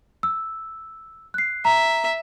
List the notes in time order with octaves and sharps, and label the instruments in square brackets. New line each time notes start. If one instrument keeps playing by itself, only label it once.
[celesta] E6
F#6 C7
[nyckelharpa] E5 [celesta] A#5